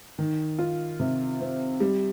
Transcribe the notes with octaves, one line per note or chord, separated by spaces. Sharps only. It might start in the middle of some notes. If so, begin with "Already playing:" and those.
D#3
F4
C3
C4
G3